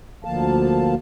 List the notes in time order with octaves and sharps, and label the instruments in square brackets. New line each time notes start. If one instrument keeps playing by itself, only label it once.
[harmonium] D2 D3 F3 A#3 F5 A5